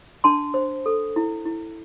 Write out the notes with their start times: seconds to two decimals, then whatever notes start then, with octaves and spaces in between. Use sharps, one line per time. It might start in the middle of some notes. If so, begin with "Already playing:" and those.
0.24 D4 A5 C6
0.54 C5
0.86 A4
1.16 E4
1.46 E4